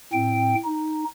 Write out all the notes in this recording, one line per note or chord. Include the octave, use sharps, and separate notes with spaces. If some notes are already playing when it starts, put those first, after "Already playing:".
A2 C4 G5
D#4